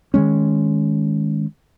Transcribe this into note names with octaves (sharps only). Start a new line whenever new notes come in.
D#3 E3 G#3 C#4